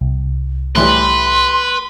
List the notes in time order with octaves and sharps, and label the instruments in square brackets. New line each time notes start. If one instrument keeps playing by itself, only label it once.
[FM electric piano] C2
[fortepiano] A2 E3 G3 [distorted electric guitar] B4 [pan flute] C6